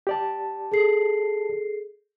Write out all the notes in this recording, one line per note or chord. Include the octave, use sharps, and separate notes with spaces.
G4 D5 A5
G#4 A4 C7